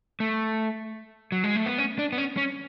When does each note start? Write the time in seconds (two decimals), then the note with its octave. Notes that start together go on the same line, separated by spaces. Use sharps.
0.20 A3
1.32 F#3
1.44 G#3
1.56 A3
1.66 B3
1.78 C#4
1.99 D4
2.12 B3
2.18 C#4
2.37 C#4